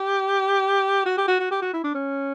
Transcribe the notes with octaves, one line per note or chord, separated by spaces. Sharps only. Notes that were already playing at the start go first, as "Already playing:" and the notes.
Already playing: G4
F#4
G4
F#4
F#4
G4
F#4
E4
D4
C#4